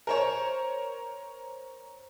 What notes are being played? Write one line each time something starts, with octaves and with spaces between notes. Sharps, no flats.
A#4 C5 C#5